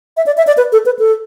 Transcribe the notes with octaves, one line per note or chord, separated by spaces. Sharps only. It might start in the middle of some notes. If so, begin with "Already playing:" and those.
E5
D5
E5
D5
B4
A4
B4
A4